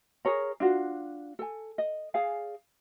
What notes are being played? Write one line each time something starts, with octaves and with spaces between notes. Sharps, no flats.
G#4 A#4 C#5 A#5
D4 F4 F#4
A4 G#5
D#5
G#4 D5 F5 G#5